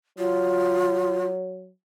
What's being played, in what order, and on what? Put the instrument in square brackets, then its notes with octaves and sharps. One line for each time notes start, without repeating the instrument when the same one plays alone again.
[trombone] F#3 [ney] F4